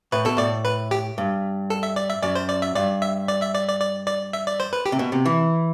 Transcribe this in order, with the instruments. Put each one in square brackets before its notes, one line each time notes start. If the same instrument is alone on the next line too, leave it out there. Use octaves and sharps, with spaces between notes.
[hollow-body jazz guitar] A2 [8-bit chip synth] B4
[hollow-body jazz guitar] B2 [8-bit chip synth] A4
[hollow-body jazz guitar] A2 [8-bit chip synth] D5
[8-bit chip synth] B4
G4
[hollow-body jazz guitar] G2
[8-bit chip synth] A4
E5
D5
E5
[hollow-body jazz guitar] F#2 [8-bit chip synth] D5
[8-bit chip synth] C5
D5
E5
[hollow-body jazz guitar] G2 [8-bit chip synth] D5
[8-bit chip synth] E5
D5
E5
D5
D5
D5
D5
E5
D5
C5
B4
G4
[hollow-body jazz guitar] C3
B2
C3
E3